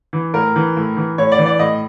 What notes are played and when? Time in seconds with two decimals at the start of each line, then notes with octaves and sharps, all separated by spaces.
0.13 E3
0.34 A2 A#4
0.56 E3
0.77 A2
0.97 E3
1.18 A2 C#5
1.32 D5
1.38 E3
1.46 D5
1.59 A2 D#5